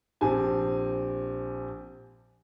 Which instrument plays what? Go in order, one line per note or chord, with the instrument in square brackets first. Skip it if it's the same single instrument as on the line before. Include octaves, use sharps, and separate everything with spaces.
[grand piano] A#1 C4 G4 G#5 A5